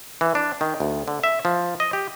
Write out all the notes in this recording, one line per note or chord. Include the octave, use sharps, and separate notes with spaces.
E3
D4
D#3
D2
D3
E5
F3
D#5
G4